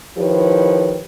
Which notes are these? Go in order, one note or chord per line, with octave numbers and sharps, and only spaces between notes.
D#3 F3 E4 G4 B4 C#5